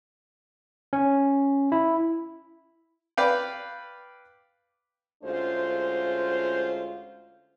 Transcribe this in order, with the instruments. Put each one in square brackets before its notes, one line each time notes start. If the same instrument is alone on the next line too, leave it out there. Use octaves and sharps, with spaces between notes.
[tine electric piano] C#4
E4
[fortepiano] B4 D5 F5 G5
[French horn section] D2 G#3 C#4 F4 C5